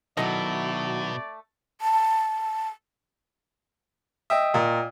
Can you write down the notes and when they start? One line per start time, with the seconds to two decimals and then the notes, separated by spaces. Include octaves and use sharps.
0.17 B2 D#3 F#3 A3 E4 D5 D#5
1.81 A5
4.30 D#5 E5 G5 D#6
4.54 A#2